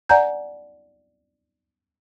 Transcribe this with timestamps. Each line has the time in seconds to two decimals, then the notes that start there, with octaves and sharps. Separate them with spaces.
0.09 D5 F#5 G#5 A#5 G6